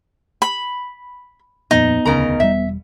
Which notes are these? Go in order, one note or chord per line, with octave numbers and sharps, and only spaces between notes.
B5
D#1 F2 A#2 B3 D#4
E1 D2 C#3 A#4 A#5
E1 C3 G3 E5